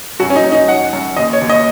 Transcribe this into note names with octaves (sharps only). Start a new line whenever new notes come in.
F#2 F#4
C#4
D#4
F#2
D#4
F#2 F#5
F#2
D#2 D#5
C#5
D#2
D#5